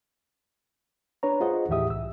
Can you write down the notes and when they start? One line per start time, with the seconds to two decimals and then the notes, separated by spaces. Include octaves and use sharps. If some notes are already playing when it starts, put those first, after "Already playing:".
1.23 D4 B4 C#5 A#5
1.40 F4 G#4 C5 D#5 F#5
1.69 D#2 A2 E3 G4 E5 D#6
1.90 C2 E6